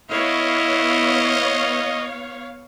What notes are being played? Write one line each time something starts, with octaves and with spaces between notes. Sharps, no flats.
B3 E4 C#5 D#5 F5